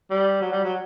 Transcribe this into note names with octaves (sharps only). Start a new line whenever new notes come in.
G3
F#3
G3
F#3